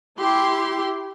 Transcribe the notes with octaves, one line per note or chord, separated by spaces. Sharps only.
E4 G4 C6